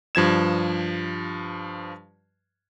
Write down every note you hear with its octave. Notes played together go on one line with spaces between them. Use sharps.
G2 F3 G#6 E7